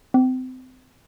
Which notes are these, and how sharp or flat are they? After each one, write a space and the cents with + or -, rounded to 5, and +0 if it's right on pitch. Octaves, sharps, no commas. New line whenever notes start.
C4 -30